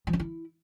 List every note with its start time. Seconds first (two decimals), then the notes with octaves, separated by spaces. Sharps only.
0.07 F3
0.13 C#4
0.20 E4